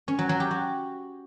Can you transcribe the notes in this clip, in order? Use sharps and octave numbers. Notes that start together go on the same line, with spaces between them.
C#4
F#3
F#3
G4
F#4